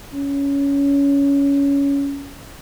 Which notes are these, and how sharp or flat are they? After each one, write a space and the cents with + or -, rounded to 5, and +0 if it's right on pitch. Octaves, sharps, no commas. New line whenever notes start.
C#4 +20